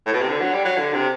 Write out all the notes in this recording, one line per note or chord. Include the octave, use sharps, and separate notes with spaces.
A2
B2
C3
D3
F#3
G3
F#3
D3
C3